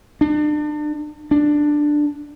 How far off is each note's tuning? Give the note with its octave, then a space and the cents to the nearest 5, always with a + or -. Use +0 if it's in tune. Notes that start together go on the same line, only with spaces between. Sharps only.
D4 +35
D4 +10